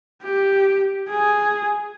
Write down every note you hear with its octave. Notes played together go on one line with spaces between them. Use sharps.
G4
G#4